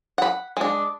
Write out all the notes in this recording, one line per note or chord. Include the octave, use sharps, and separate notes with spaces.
F#5 B5
G#3 D4